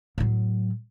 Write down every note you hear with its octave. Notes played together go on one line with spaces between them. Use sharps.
A2 F#3